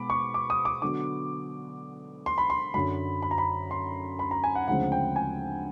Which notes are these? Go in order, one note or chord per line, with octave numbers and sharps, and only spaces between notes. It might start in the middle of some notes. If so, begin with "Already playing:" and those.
Already playing: B2 G#3 B3 B5 D6
C#6
D6
D#6
D6
D3 F#3 B3 D6
C6
B5
C6
F#2 D3 F#3 B5
B5
A#5
B5
C6
B5
A#5
G#5
F#5
D2 C#3 F3 G#3 C4 F#5
G5
G#5